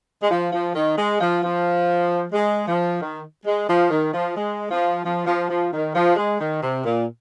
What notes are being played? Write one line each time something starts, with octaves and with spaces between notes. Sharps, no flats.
G#3
F3
F3
D#3
G#3
F3
F3
G#3
F3
D#3
G#3
F3
D#3
F3
G#3
F3
F3
F3
F3
D#3
F3
G#3
D#3
C3
A#2